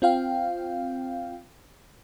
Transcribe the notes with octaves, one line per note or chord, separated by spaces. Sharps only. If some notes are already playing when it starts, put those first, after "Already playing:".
C4 F4 F5 G5